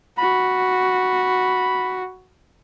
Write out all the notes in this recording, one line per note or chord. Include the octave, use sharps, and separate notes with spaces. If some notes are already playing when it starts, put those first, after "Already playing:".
F#4 B5